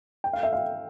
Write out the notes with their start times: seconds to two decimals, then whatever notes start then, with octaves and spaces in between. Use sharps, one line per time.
0.24 G5
0.33 F5
0.43 E5
0.53 F5